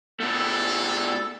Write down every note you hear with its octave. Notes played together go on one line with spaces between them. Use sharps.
B2 A3 A4